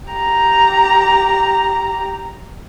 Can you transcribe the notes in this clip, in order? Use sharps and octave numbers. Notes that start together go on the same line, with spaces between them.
G4 A#5